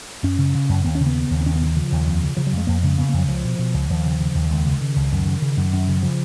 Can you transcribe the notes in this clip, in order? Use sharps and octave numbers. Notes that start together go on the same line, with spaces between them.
F#2 C#4
C#3
C#3
F#2
D#2 B3
C#4
C#3
B3
C#3
D#2
B3
D#2 C#4
B3
C#3
D#3
C#3 F3
D#2
F2
C#3
C#3 F3
F#3
F2
G#3
F2 A#3
C#3 G#3
C#3 B3
A#3
F2
F#3
C#2 F3
B2
B2
C#2
D#2 F3
C#3
C#3
D#2
C#2 D#3
C#3
C#3
C#2
F#2 D#3
C#3
C#3
F#2
F#2
C#3
C#3 F3